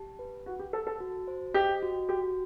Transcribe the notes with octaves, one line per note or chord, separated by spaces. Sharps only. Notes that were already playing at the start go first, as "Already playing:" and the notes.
Already playing: G4 A5
B4
F#4 F#5
G4
A4 A5
A4
F#4
C5
G4 D#5
F#4
F#4 G4